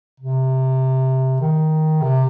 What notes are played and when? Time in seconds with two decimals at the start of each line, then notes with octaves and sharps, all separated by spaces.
0.20 C3
1.41 D#3
2.01 C3